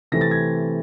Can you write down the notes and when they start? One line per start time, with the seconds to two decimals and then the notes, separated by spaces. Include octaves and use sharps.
0.12 C3 E3 A3 C4 A#6
0.21 A6
0.31 G#6 A#6